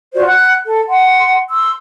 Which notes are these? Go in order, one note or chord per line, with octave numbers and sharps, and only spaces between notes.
F4 F#4 C5 D5
F#5 F#6
A4
F#5 C6
C6 E6